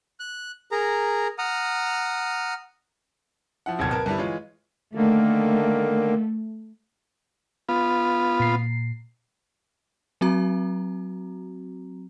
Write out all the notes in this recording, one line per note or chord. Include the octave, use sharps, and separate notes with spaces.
F#6
G#4 A#4 A#5
F#5 A#5 D#6 F6
F3 E4 F#5
D1 G#1 D#2 B2 A5 G#6
A#4 B4 A5 G#6
G2 D3 G3 B3 E4
E3 G#3 F4 C#5
D3 D#3 A3 A#3
B3 F4
A#2 C7
F#3 C4 F#4 A#5